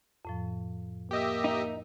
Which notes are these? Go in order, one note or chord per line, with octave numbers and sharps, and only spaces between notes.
F2 A2 F3
A#3 G4 D#5 E5
D#4